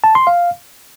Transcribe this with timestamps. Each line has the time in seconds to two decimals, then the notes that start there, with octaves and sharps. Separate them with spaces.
0.04 A5
0.15 C6
0.27 F5